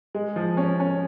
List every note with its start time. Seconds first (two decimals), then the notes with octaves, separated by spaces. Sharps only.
0.15 G#3
0.36 F3
0.57 C#4
0.80 C#4